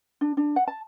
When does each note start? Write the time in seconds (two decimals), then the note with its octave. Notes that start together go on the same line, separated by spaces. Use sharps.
0.21 D4
0.37 D4
0.56 F#5
0.68 A5